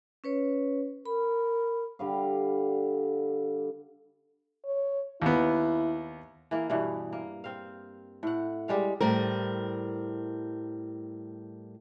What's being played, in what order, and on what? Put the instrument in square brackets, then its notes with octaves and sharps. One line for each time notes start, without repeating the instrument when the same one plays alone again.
[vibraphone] C#4 B4 C#5
[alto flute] A#4 [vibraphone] B5
[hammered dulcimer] D3 G3 F5
[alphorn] C#5
[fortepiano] D#2 B3 [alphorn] E4
[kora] E3 A#3
G2 B2 E3
A#3
C4 F5
A2 F#5
G3 G#3 F5
[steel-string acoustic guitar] A2 G3 C4 A#4